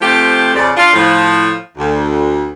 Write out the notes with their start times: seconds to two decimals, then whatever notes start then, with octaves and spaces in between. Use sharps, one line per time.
0.01 F3 A3 C4 G4
0.54 F2 C#3 C5 D5
0.76 D4 F4
0.93 A2 F3
1.77 D2